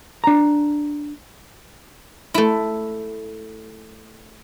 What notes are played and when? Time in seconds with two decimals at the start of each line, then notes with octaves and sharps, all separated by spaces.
0.24 D4 A#5
2.34 A3 E4